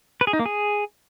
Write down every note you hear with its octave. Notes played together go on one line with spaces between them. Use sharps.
B4
G#4
D#4
A#3
G#4